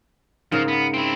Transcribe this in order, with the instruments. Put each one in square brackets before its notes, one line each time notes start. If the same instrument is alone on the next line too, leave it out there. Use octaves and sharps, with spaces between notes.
[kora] G#2 C#3 A#4 [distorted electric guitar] F3
[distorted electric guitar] B3
C4 E4